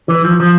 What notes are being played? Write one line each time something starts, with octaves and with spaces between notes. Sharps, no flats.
E3
F3
F3